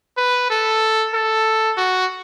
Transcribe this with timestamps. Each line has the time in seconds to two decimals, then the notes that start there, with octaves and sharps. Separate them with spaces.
0.17 B4
0.50 A4
1.14 A4
1.77 F#4